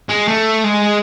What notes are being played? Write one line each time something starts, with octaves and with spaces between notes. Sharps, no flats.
G#3
A3
G#3